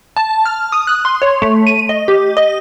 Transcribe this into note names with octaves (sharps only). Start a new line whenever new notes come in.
A5
F6
D#6
F#6
C6
C#5
A3
D#7
D#5
G4
D#5